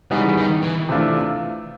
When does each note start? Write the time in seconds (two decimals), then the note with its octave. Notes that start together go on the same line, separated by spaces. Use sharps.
0.11 C#3 E3 G3 B3 D#4 G#4
0.37 D#3
0.63 E3
0.89 C3 E3 A3 D4 F4